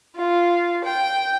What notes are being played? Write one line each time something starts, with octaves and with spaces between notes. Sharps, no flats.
F4
G5